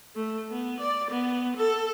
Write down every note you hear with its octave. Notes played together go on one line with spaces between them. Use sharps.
A3
B3
D5
B3
A4